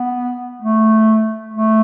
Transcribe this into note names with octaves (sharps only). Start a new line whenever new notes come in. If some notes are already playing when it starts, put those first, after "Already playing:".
Already playing: B3
A3
A3